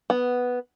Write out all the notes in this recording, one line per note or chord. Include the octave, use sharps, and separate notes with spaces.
B3